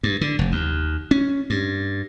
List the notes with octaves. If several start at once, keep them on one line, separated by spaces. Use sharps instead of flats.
G2
D3
F1
D#2
C#4
G2